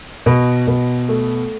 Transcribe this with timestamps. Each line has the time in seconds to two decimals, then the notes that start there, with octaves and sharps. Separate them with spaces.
0.26 B2
0.67 B2
1.09 A3